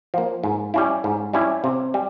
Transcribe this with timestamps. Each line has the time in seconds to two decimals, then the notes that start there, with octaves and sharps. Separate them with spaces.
0.14 F3 A#3
0.44 G#2
0.74 G3 C#4 E4
1.04 G#2
1.33 G3 C#4 E4
1.64 C3
1.94 G3